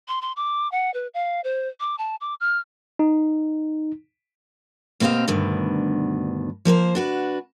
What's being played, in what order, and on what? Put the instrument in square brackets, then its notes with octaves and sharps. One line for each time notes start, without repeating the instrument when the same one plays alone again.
[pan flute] C6
C6
D6
F#5
B4
F5
C5
D6
A5
D6
F6
[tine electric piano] D#4
[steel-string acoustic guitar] B2 A#3 C4 G4 D#5 F5
D2 G2 B2 D#3 D4
F3 A#3 A#4 C5
D4 F#4 B4